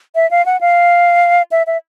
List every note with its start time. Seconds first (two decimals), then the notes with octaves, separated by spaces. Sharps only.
0.15 E5
0.31 F5
0.46 F#5
0.61 F5
1.52 E5
1.67 E5